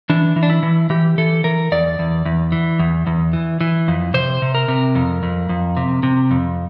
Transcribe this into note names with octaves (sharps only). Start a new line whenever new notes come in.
E3 D4
E3
D4
E4
E3
E3 G4
E3 A4
E3 A#4
E2 D5
E2
E2
E3
E2
E2
E3
E3
F2
C3 C5
C3
A#4
C3
F2
F2
F2
C3
C3
F2